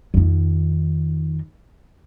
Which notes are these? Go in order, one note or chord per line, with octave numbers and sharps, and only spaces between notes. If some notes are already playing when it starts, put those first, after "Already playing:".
F2 D#3